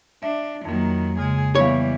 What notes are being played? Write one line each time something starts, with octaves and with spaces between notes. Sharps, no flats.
D4 E5
F2 D#3 F#3 A#3
C#3 G#3 G#4
E3 G3 B3 C#5 F5